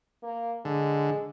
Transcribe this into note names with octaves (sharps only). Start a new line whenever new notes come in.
A#3
D3 G#3